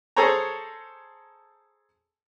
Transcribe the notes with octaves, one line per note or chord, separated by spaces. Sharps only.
G#4 A4 C5 C#5 A#5